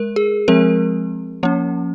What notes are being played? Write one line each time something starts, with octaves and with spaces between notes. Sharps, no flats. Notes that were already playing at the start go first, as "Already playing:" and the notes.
Already playing: G#3 A#4
G#4
F3 G#3 C4 A#4
F3 A#3 C#4